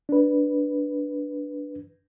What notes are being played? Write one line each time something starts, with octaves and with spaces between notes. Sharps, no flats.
D4 B4